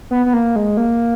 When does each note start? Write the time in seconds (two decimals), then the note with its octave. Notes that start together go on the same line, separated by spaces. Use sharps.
0.11 B3
0.26 B3
0.33 A#3
0.56 G#3
0.77 A#3